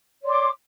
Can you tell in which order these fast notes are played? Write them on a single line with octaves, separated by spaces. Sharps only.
C#5 D5 C6 D6